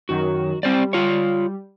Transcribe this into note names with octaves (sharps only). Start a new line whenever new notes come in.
F#2 D#3 F#3 F#4
G3 C4 C5 D5
F4 C#5